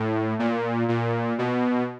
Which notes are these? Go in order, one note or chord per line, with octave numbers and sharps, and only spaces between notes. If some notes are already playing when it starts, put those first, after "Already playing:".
Already playing: A2
A#2
A#2
B2